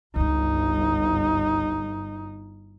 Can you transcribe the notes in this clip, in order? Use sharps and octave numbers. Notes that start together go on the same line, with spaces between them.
G1 C#2 G2 D#4